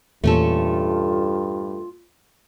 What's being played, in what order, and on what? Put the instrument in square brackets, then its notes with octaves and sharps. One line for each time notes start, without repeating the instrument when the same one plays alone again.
[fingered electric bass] E2 A#2 [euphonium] G2 [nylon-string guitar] A3 C#4 A4 [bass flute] F4